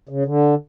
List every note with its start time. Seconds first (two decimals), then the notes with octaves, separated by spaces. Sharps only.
0.09 C#3
0.26 D3